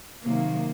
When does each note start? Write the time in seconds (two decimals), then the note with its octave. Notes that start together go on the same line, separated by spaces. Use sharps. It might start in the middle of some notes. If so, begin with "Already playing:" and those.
0.22 C3 D#3 F#3 A#3